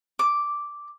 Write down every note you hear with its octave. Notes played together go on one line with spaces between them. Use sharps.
D6